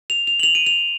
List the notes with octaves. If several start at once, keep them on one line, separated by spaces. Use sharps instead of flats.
F7
F7
F#7
F7
D#7
F7